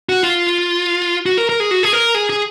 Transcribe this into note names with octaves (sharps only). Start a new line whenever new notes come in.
F#4
F4
F#4
A#4
A#4
G#4
F#4
G#4
A#4
G#4
G#4